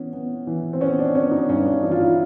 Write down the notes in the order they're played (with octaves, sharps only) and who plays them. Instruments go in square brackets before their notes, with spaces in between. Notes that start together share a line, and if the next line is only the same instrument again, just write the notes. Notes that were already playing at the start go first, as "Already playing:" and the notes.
Already playing: [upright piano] E3 B3 C#4
B3
E3
C4
B3 C#4
D4
B3 C#4
D#4
G2 C#4
D4
E3 D#4
F4
E4